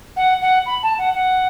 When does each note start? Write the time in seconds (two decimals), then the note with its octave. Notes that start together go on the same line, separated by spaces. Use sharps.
0.16 F#5
0.41 F#5
0.66 B5
0.83 A5
0.98 F#5
1.15 F#5